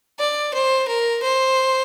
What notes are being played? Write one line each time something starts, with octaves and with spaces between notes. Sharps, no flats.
D5
C5
A#4
C5